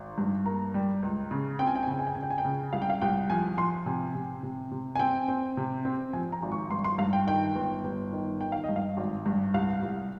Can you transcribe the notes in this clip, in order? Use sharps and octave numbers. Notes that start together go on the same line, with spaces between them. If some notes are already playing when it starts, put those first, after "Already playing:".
Already playing: G#1
G2
A#3 A#5
G3
C#2
C#3
C4 G5
G#5
G5
G#5
C#3 G5
G#5
G5
C#3 G#5
G5
G#5
G5
C#3
C2 F5
G5
F5
C2 G5
F3 G#5
F3 C6
C3 G#5
C3
C3
C3
G#5
C4 G5
C4
C3
C4
F3 G#5
A#5
G#1
C#6
G2 C6
C6
G2 F5
G5
D#3 G5
G1
G1
D#3
D#3 G5
F5
D#5
G2
F5
G#1
G2
C2 F5
C2